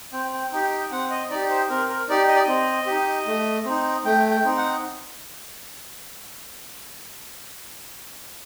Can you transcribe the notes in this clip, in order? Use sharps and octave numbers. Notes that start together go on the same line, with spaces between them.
C4 G5
G5
D#4 G4 G5
G5
C4 F#5
D#5
D#4 G4 D5
C5
C4 A#4
A#4
D#4 G4 D5
D#5
D5
C4 D#5
D#4 G4
A3
C4 D#4
A3 G5
G5
C4 D#4
F#5